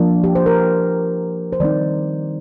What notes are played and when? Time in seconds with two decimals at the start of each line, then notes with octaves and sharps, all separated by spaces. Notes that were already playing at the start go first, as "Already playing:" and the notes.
Already playing: F3 A#3 D4
0.24 G4
0.35 C5
0.46 A#4
1.53 C5
1.60 D#3 G3 C4 D#4 D5